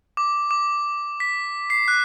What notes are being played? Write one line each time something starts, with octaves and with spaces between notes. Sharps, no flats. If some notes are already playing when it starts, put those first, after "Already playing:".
D6
D6
B6
C7
F#6